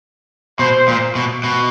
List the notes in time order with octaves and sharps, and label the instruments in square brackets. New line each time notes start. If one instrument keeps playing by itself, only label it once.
[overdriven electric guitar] B2 [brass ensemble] C5
[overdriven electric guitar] A#2
B2
B2